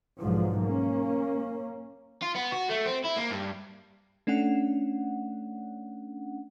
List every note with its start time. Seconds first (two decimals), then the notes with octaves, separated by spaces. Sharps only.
0.19 B1 G#2 D3 F3
0.62 A#3 C#4
2.22 F4
2.35 B3
2.52 F#4
2.70 A3
2.86 C4
3.05 E4
3.17 A#3
3.31 G2
4.27 A3 C#4 D4 F#5